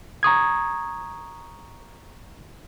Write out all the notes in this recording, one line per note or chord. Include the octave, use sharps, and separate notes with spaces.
A#5 C#6 D#6 G#6